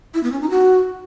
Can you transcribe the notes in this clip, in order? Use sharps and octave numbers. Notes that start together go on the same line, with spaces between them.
E4
B3
C#4
D#4
F#4